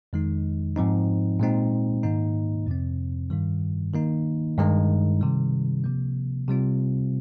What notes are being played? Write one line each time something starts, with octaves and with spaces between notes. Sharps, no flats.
F2 D#3 G#3 D#4
G#2 F3 C4 D#4
A#2 G#3 C4 D#4
G#2 D#3 A#3 D#4
F2 C3 F3 C4
G2 D#3 G3
D#3 A#3 D#4
G2 D#3 G#3 D#4
C3 D#3 G3
C3 F3 A#3
C3 G3 C4 F4